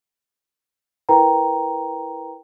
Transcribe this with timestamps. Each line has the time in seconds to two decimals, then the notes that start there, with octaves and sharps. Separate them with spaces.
1.09 E4 A#4 B4 G5 A#5